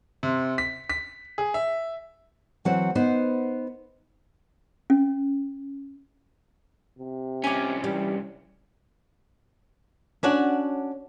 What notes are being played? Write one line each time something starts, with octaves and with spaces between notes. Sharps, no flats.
C3
B6
B6
G#4
E5
E3 F#3 C4 F#4 C5 F#5
B3 D#4 B4 C5
C#4
C3
C2 C#4 G#5 D6
E3 G3
C#4 D4 F#4